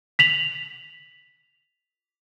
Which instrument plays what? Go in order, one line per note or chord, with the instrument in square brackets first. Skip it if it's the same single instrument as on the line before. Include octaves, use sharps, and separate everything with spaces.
[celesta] B6 F7 F#7